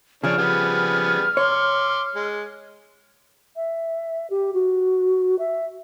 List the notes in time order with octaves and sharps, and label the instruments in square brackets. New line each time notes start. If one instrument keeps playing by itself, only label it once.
[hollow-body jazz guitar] C#3 F3 [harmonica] D4 G#4 C#5 [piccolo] F6
[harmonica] G3 B3 G#4
[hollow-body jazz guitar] C#5 [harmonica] C6 D6
[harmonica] G#3
[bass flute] E5
G4
F#4
E5